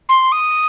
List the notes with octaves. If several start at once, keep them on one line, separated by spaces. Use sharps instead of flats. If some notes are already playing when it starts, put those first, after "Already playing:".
C6
D#6